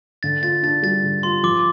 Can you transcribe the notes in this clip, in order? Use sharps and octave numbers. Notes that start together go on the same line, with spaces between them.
D3 A6
F4 A6
D4 A6
G3 A6
D3
F4 C6
F3 D6